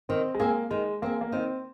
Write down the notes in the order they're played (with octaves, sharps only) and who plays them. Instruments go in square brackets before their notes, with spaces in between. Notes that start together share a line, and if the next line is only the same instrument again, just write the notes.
[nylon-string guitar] D#3 [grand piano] C4
[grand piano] G#3
[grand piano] A#3 [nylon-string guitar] C4 G#4
[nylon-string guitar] D#3 [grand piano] G#3
[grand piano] A#3 [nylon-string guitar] C4 G#4
[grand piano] A#3
[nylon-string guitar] D#3 [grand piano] C4